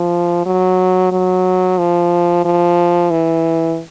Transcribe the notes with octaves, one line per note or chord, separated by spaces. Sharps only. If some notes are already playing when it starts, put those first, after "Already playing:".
Already playing: F3
F#3
F#3
F3
F3
E3